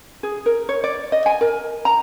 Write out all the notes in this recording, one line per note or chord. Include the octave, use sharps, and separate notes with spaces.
G#4
A#4
C#5
D5
D#5
G#5
A#4
A#5